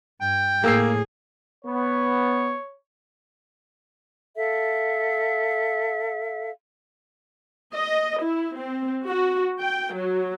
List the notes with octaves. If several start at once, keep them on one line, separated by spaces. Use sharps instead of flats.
G2 G5
A2 A#3 G#4 E6 C7
B3 C#5
A4 E5 F5
D#5
E4
C4
F#4
G5
F#3